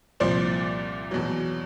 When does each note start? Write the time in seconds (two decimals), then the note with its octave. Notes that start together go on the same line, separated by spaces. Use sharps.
0.20 C2 A#2 F3 C5 D5
1.11 E2 B2 F#3